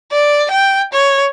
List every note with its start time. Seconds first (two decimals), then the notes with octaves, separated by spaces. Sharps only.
0.12 D5
0.51 G5
0.93 C#5